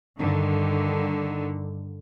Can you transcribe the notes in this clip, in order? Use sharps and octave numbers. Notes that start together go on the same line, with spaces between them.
G2 D3 D#3